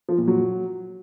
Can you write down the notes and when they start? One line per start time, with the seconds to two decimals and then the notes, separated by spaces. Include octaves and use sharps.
0.09 F3
0.18 A#2
0.28 F#3